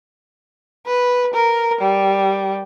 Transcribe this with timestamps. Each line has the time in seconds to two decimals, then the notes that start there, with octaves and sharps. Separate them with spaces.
0.87 B4
1.34 A#4
1.80 G3